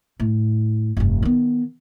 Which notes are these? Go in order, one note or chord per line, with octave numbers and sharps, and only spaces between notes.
A2
F1 G2
D#3 B3